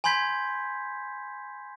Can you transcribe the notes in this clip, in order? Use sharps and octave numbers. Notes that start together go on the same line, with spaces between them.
G#5 B5 C6 G6 G#6 B6